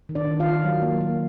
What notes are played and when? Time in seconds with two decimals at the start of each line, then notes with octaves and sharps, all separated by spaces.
0.09 D#3
0.15 D4 D5
0.27 D#3
0.40 F4 F5
0.46 D#3
0.64 F#3
0.82 A#3
1.01 A#3